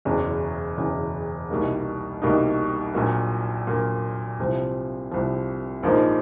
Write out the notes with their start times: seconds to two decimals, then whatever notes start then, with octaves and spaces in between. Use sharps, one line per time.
0.05 F#1 E2 B2 G#3 C#4
0.77 F#1 E2 B2 G#3 C#4
1.50 C2 B2 G3 A#3 D#4
2.22 C2 B2 G3 A#3 D#4
2.94 A#1 A#2 F#3 A#3
3.67 A#1 A#2 F#3 A#3
4.39 C2 C3 F3
5.11 C2 C3 F3
5.83 A#1 G#2 F3 A#3 D#4